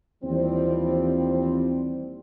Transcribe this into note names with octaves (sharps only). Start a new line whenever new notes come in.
D#2 E3 F3 G3 C4